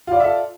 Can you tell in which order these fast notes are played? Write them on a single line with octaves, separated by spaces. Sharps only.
F4 D5 F5 E5 A4